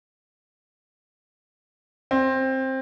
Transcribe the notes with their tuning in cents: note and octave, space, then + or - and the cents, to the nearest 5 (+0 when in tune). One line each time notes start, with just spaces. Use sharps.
C4 +15